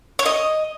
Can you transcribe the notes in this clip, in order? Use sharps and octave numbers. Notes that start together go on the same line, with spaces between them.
C#5
D#5